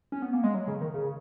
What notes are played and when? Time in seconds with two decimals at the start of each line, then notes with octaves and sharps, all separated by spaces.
0.12 C#4
0.22 B3
0.33 A#3
0.44 G#3
0.55 F#3
0.68 C#3
0.81 D#3
0.94 C#3